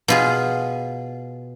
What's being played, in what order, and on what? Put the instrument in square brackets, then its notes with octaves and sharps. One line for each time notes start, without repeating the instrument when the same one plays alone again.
[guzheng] B2 F4 G#4